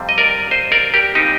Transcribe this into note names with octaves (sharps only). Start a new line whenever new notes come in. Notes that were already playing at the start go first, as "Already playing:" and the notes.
Already playing: F2 C3 G3 C4
D#5
A#4 D5
C5 D#5
A#4 D5
G4 A#4
A#2 G3 C4 D#4 G4